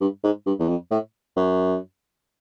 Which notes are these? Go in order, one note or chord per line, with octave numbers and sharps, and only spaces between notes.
G2
G#2
G2
E2
F2
A2
F#2